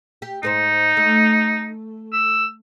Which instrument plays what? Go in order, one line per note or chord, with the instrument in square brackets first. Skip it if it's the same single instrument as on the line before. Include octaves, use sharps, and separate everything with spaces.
[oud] G4
[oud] G#2 A#4 C5 [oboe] D#4
[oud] A3
[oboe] E6